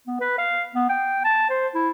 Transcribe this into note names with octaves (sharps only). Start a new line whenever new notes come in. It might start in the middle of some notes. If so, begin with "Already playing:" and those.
B3
B4
F5
B3
G5
A5
C5
E4